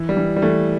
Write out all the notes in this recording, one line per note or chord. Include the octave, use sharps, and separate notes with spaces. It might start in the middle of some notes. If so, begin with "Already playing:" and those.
Already playing: E3
G3
E3
G3
E3 A3